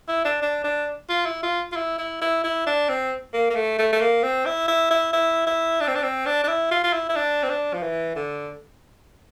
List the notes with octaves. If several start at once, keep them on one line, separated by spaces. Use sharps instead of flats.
E4
D4
D4
D4
F4
E4
F4
F4
E4
E4
E4
E4
D4
C4
A#3
A#3
A3
A3
A3
A#3
C4
E4
E4
E4
E4
E4
D4
C4
D4
C4
D4
D4
E4
F4
F4
E4
E4
D4
C4
D4
F3
E3
D3